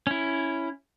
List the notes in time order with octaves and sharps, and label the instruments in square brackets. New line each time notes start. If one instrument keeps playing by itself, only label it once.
[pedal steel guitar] C#4 E4